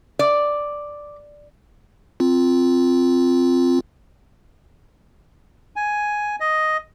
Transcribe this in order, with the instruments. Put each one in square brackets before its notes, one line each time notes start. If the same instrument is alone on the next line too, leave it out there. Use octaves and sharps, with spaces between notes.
[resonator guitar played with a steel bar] D5
[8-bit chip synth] C4 F4
[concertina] G#5
D#5